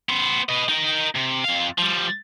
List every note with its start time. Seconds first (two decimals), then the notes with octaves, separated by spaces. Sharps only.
0.09 B3 C5
0.49 B4 D#5
0.69 D#4 A#4
1.15 C3
1.44 F2 F5
1.78 F3 G3